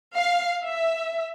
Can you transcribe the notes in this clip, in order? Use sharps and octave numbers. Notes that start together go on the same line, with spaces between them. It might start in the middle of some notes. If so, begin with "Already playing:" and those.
F5
E5